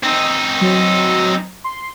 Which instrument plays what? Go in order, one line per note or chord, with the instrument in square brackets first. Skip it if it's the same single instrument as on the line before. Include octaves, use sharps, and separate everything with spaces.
[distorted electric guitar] C4 D#4
[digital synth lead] F#3
C6